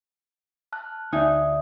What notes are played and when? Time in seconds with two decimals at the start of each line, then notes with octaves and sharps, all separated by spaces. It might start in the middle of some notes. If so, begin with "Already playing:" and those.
0.72 A5 F6 F#6
1.13 D2 D#4 D5 E5 G#5 D#6